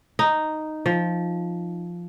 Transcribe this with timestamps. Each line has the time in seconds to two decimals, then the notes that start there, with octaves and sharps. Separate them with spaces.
0.19 D#4
0.86 F3